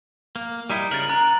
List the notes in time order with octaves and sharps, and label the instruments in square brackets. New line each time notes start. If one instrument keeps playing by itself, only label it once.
[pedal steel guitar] A#3
G3 D#4 E4
[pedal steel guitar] C#3 A#4 [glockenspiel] A6 F#7
[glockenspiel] A#5 A6 [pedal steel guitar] F#6